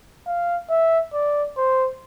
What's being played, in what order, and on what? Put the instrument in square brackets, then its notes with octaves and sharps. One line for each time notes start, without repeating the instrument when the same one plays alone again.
[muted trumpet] F5
E5
D5
C5